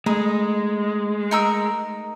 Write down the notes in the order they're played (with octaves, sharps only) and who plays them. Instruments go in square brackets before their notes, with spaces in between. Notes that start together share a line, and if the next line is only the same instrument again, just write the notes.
[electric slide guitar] G#3 [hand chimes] A3 [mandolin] D#4
[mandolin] D#4 A#4 E6